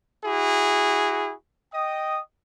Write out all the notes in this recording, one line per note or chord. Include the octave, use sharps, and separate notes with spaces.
E4 F#4 G#4
D#5 G5 D#6